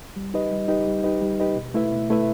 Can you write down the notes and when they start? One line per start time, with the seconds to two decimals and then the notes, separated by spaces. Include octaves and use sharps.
0.16 G3
0.34 D#4 G4 B4 D#5
0.51 G3
0.68 D#4 G4 B4 D#5
0.86 G3
1.04 D#4 G4 B4 D#5
1.21 G3
1.40 D#4 G4 B4 D#5
1.56 B2
1.74 A3 E4 B4 E5
1.92 B2
2.10 A3 E4 B4 E5